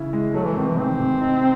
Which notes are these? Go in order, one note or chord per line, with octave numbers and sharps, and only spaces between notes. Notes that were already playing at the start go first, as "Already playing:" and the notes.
Already playing: C#3 E3 E4
G#3
F#3 A3
E3
C3 D#3
E3
D#3 C4
C3
D#4